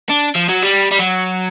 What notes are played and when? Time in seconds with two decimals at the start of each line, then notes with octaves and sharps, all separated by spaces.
0.09 D4
0.35 F3
0.49 F#3
0.63 G3
0.92 G3
0.99 F#3